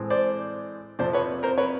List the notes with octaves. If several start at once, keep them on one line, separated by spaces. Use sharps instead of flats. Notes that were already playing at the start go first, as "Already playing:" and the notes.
Already playing: A2 E3 G#3 C4
C5 D5
F2 C3 F3 C5 D5
B4 C#5
A#4 C5
B4 C#5